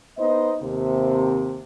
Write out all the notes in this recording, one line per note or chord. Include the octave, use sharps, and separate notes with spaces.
B3 D#4 C5 D#5
D#2 C3